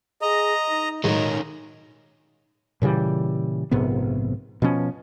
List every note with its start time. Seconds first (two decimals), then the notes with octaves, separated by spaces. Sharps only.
0.22 G#4 D#5 A#5
0.69 D#4
1.04 A2 D#3 F#3 G#3 C#4 D#4 A#5
2.82 A#2 C#3 E3 G3
3.71 A#1 G#2 C3 B3
4.62 B2 F3 C#4